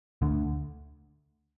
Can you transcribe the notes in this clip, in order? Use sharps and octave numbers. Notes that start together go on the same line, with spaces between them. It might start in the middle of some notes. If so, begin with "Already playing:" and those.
D2 D3